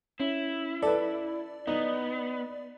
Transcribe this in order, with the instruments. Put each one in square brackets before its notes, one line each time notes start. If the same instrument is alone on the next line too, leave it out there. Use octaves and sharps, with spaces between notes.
[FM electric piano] C#4 [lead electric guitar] E4
[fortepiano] A4 B4 [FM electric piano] D5
[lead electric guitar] B3 [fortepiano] D#4